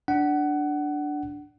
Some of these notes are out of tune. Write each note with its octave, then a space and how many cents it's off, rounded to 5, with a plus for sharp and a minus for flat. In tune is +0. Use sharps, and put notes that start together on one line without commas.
D4 +0 F#5 +20